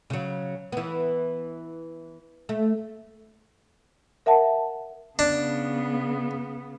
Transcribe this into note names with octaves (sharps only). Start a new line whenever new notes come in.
C#3 F#3
E3 B3
A3
A#4 E5 F#5 A5
C#3 B3 D4